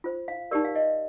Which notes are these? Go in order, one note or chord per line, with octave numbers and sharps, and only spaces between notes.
F4 C5
F5
D#4 G4 A#4 D5
F5
D#5